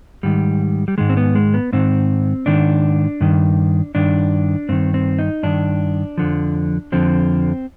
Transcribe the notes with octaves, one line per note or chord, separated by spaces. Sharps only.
G#2 D#3 G3
G3
G#2 D#3 G#3
C4
B3
G#3
B3
G#2 D#3 C4
G#2 D#3 D4
G2 D#3
G2 D#3 D4
G2 D#3 C4
C4
D#4
G2 D#3 D4
F2 D3 F3
F2 D3 F3 C4